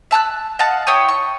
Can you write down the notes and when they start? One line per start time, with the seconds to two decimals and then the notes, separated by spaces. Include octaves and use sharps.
0.11 E5 A5 E6 F#6
0.59 D#5 F5 F#5 A5
0.87 E4 C#5 G5 D#6
1.09 C#6